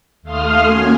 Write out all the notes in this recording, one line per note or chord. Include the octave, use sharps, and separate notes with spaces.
D#2 A3 F5 C6 D#6 F6
A#3 C#4 F#4 G#5